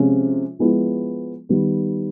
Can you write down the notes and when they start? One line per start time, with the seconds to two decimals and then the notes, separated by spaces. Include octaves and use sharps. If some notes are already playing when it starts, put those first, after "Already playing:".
Already playing: C3 F3 G#3 C#4 F4
0.59 F3 G#3 B3 E4
1.49 D#3 G3 B3